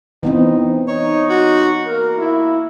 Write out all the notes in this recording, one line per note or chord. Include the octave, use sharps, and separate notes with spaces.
E3 B3 C4 D#4
D#4 C#5
F#4
A#3 A#4
E4